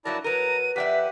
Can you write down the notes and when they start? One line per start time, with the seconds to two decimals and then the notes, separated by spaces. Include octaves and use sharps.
0.05 G2 F#3 E4 A#4 D5 A5 A#6
0.24 F#3 A#4 B4 A#5 D#7
0.76 F2 G4 D5 E5 F#5 B6